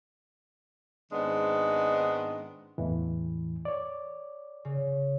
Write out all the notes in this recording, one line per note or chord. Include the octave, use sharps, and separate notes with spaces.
G#2 D#3 G#3 B3 C4 D4
E2 A2 E3
C#5 D5
C#3